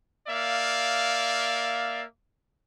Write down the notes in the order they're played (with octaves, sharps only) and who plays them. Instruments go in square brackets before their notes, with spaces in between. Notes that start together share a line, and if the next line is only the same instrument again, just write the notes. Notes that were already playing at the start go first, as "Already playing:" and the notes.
[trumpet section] A#3 D5 E5 F5